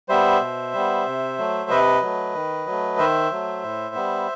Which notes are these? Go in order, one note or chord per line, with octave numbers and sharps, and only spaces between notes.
G3 B3 C5 E5
B2
G3 B3
C3
F#3 A3
C3 B4 D#5
F#3 A3
D#3
F#3 A3
D#3 C5 E5
F#3 A3
A2
G3 B3